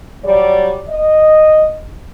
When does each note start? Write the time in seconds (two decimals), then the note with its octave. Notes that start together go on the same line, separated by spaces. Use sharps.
0.24 F#3 G3 D5
0.88 D#5